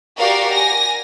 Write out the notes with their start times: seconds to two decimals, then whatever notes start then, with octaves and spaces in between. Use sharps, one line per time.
0.18 F#4 G4 A#4 D5 F5
0.53 G#5 A#6